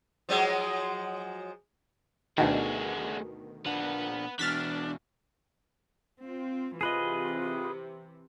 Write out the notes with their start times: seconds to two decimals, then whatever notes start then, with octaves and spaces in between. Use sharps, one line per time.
0.29 F3 F#3 G#3
2.38 D2 B2 D#3 A3 D4 F#4 G#4
3.66 A#2 D4 B4 F#5
4.39 E2 B2 D4 F6 A6 B6
6.23 C4 F4
6.81 C3 E3 F4 G#4 B4 D#5